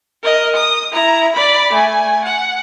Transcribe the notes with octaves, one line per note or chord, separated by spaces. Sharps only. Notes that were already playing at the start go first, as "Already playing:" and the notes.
A#4 D#5
D#6
E4 A#5
D5 B5
A3 G#5
F#5